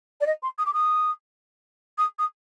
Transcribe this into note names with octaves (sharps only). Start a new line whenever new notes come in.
D5
D#5
C6
D#6
D6
D#6
D#6
D#6